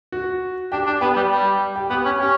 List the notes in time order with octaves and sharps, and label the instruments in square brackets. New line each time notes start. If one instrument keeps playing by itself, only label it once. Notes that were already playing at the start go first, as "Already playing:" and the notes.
[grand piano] F#4
[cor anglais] D4 [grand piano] G4
[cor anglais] D4
[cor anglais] B3 [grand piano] G4 B4
[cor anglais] G3
G3
[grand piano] G4
[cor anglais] B3 [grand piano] G4
[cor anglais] C#4
[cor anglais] C#4 [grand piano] G4